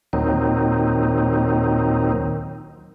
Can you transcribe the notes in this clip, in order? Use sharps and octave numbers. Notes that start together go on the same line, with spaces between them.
D#2 A#2 D#3 F#3 C4 D#4